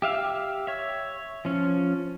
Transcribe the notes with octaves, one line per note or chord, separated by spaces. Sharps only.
G4 E5 F5
C#5 E5
F3 C#4